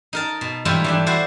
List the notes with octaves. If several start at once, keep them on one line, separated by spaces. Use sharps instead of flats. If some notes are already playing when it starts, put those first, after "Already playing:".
D#4 A#4 A5
B2
G#2 E3 G3 A3 E4 F4
E3 G3 D4
E4 F#4 C5 D5